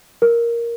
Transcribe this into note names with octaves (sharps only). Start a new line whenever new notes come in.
A#4